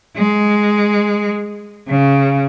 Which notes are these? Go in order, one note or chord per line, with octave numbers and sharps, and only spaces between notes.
G#3
C#3